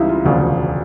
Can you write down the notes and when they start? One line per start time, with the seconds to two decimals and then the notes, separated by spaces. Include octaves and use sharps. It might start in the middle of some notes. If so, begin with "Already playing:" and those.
Already playing: C#2 C#3 E3 G3 D#4 E4
0.09 F4
0.25 E1 D2 C#3 F3